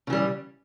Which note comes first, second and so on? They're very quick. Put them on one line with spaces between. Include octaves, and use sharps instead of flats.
C#3 E3 G3